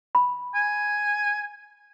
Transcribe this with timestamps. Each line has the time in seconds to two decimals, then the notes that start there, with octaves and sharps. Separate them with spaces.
0.15 B5
0.55 G#5